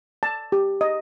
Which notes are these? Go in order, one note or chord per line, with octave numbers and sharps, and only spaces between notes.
A5
G4
D#5